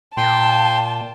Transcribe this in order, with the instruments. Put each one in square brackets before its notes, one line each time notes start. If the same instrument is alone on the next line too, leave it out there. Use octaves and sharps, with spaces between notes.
[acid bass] A#2 [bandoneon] G5 C6 [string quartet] A5